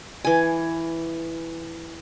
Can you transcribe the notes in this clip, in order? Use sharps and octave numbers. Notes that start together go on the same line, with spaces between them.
E3 G#5